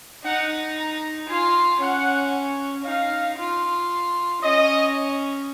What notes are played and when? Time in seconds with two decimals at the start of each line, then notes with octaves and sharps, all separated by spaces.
0.25 D#4 F#5
0.77 A#5
1.28 F4 G#5
1.81 C#4 F#5
2.85 D#4 F5
3.38 F4
4.42 C#4 D#5